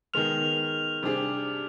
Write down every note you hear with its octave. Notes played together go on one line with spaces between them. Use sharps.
D#3 G#3 B3 F6 F7
C3 G3 D4 G#4